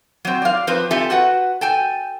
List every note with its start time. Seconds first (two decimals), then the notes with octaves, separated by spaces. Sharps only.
0.25 F#3 C4
0.42 D5 F5
0.67 F3 C4 B4 C5
0.91 C4 F4 G4 A4 E5 G#5
1.10 F#4 B4 F#5
1.61 A4 G5 G#5